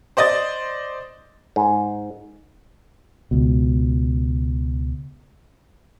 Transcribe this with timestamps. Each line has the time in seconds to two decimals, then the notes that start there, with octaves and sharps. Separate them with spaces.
0.17 C5 D5 D#5 D#6 A6
1.56 G#2
3.31 C#2 B2